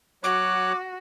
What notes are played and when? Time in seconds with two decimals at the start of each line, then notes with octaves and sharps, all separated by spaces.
0.24 F#3 F#4 C#5 D6 F#6